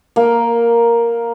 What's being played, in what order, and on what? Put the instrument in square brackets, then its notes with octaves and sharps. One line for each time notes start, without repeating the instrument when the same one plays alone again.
[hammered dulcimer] A#3